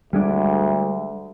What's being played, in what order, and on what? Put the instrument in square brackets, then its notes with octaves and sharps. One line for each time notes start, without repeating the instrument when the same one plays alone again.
[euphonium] D2 [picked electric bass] G3 G#3 D4